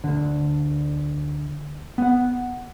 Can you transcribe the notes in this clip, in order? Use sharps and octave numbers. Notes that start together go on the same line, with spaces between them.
D2 D3
B3 F#5